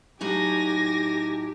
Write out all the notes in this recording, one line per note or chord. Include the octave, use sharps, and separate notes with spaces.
A2 F#3 D#4 G4 G#5 A#6